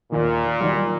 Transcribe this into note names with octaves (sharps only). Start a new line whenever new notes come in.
D#2 A#2 D#3
D#3 F#3 G3